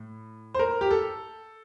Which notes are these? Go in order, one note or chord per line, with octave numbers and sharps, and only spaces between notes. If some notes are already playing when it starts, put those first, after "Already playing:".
Already playing: A2
C5
A#4
G4
A4